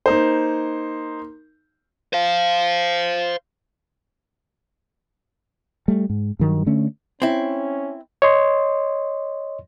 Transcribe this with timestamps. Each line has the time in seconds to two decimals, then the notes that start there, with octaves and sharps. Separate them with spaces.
0.06 A#3 D#4 C5
2.13 C5 F5
5.88 G3 A3
6.10 G#2
6.39 G2 D#3 F#3
6.66 D3 A3 C#4
7.22 C4 C#4 E4
8.22 C#5 D#5 C6